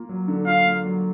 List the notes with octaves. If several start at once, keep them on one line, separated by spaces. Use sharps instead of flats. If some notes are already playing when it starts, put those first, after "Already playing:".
Already playing: A#3 F4
F#3
D3
F4 F5
A#3
F#3